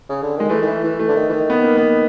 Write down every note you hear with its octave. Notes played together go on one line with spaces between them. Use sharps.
C#3
D3
D#3 G#3
E3 A3
D#3
E3
E3
E3 A3
D3
D#3
E3
D#3
B3
A#3
B3